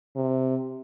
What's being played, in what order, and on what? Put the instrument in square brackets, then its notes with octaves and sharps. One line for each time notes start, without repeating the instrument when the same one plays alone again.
[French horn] C3